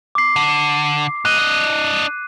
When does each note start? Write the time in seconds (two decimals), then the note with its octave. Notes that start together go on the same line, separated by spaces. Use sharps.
0.15 D6 C7
0.36 D3
1.25 A#2 D#5 F#6 D#7
1.39 D4 D#5